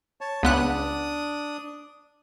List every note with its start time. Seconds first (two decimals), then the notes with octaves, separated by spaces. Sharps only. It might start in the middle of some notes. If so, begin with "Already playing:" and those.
0.21 C#5 A5
0.43 C#2 B3 D4 D#6 F#6